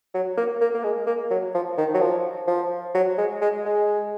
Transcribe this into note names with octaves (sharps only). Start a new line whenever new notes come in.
F#3
A#3
A#3
A#3
G#3
A#3
F#3
F3
D#3
F#3
F3
F3
F#3
G#3
G#3
G#3